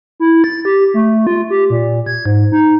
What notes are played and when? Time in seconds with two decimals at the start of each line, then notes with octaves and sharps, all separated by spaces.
0.20 E4
0.44 A6
0.65 G4
0.94 A3
1.27 F4
1.50 G4
1.70 A#2
2.06 G#6
2.26 G#2
2.52 D#4